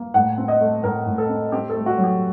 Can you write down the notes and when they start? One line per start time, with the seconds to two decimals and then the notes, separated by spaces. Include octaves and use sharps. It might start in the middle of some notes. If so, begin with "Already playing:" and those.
Already playing: A#3
0.14 A2 F#5
0.38 C4
0.48 D#5
0.61 A3
0.83 A2 A#4
1.06 A2
1.18 A4
1.29 C4
1.52 C4 G4
1.70 A4
1.75 A3
1.86 F#4
1.98 F#3
2.04 G4